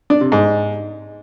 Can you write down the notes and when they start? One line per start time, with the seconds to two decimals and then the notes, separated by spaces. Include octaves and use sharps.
0.10 D4
0.21 C3
0.32 G#2